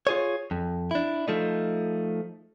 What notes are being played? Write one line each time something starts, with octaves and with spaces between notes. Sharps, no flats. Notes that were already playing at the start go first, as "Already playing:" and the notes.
F4 G#4 C#5
F2
D4 E4
F3 A3 D#4